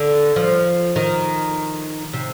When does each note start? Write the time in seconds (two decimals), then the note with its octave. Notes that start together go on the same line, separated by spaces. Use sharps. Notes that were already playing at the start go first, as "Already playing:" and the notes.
Already playing: D3
0.36 F3
0.96 D#3
2.13 C3